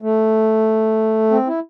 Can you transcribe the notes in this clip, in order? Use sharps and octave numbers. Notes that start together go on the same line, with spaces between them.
A3
C4
E4